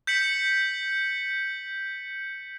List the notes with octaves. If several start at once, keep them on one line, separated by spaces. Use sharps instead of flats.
G6 B6 C#7 F#7